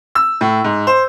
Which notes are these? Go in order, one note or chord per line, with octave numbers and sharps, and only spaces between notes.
E6
A2
G#2
C5